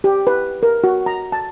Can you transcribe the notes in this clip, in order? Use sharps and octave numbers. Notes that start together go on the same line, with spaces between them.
G4
B4
A#4
F#4
A#5
A5